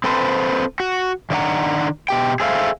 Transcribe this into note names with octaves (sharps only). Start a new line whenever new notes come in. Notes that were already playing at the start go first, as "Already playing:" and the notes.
C4 A4 B4 C5
F#4
D#3 D4 B4 D#5 F#5 A#5
B2 G4 G5
G#4 A4 C5 E5 F5